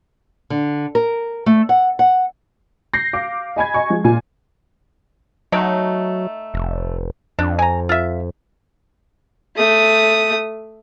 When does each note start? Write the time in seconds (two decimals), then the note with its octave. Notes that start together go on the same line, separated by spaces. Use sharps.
0.50 D3
0.95 A#4
1.46 A3
1.69 F#5
1.99 F#5
2.93 G6 A#6 C7
3.13 F5 D6
3.56 D#5 G#5 B5 G#6
3.74 D#5 G#5 C#6
3.90 F3 G#3
4.04 A#2 F4 G#5
5.52 F#3 A3 D#4 G5
6.54 F1
7.39 F2 D4
7.59 G#5 A#5
7.89 F4 E5
9.57 A3 D#6